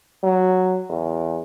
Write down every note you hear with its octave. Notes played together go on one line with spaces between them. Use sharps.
F#3
E2